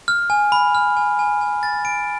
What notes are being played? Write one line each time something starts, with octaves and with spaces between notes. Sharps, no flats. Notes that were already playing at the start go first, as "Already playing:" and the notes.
F6
G#5
B5
F6
G#5
G#5
G#5
A6
D7